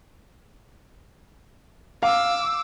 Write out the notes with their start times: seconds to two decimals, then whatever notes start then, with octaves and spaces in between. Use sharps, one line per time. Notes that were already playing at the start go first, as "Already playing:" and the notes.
2.03 F5 D6 E6